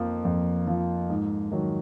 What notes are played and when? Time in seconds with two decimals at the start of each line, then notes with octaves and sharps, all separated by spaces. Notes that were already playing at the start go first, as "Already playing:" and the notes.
Already playing: F2 F3 A#3
0.25 F2
0.67 F3
1.10 G#2
1.52 D#3 F#3